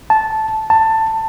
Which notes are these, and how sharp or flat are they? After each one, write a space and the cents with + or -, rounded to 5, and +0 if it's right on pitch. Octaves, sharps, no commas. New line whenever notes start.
A5 -10
A5 +15